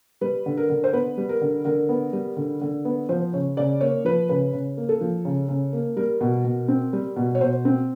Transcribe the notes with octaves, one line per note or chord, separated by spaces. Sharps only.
G3 B4
D3
A#4
D3
C5
B3 B4
G3
A#4
D3
D3 A#4
B3
G3
D3
D3
B3
F3 C5
C#3 C#5
C#3 D5
A#3 C#5
F3 B4
C#3 B4
C#3
A#3
A4
F3
C#3
C#3
A#3
G3 A#4
B2
B2
C4
G3
B2
C#5
B2 C5
C4